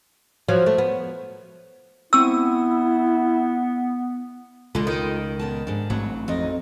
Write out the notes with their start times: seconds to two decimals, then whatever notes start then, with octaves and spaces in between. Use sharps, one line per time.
0.48 F3 F#3
0.66 A3
0.78 B3
2.13 B3 C4 E4 C#6 E6 D#7
4.75 C#2 D3 G#3 F4
4.87 D#3
5.39 A#2 B3 A5
5.67 G#2 D4
5.90 A1 F#3 A3 C4
6.28 F2 D#4 D#5